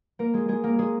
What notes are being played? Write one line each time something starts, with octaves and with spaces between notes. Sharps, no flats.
A#3 A#4
G#3 G#4
G#3 G#4
A#3 A#4
G#3 G#4